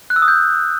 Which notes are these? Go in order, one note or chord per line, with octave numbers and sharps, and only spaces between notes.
F#6
E6
D#6
G6